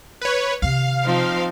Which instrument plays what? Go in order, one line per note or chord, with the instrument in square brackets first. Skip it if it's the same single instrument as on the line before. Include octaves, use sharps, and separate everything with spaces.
[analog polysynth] B4 C#5
[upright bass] C3 D#3 [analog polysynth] F5
[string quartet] F3 C4 D#4